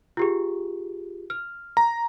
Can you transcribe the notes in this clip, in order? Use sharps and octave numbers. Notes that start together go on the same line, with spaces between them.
F4 G4 G#4
F6
A#5